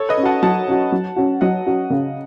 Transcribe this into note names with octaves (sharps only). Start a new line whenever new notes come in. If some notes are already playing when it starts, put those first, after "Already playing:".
Already playing: A4 C#5
B4 D#5
C#4
F#4 F#5 A5
F#3 F#5 A5
C#4 F#4
F#3
C#4 F#4
F#3 D#5 F#5
C#4 F#4
C#3